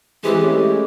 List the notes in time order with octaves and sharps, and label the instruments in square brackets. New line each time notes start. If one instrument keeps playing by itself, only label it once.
[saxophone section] E3 G#3 C4 [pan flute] G4
[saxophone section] G#3 A3 C#4